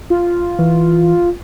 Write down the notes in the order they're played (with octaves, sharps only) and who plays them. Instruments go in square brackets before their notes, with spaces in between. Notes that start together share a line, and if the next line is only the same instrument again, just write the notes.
[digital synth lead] F4
[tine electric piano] E3